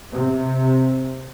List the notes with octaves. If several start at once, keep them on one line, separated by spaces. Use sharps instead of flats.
C3